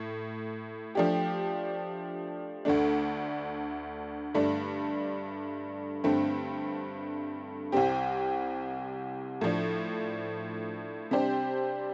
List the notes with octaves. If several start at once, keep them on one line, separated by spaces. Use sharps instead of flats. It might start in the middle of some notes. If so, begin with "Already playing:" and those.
Already playing: A2
F3 A3 D4 G4
D2 D3 A3 D4
G2 D3 A3 D4
G2 D3 A3 C4
C2 C3 G3 C4 G4
A2 F3 D4
C3 G3 D4 G4 C5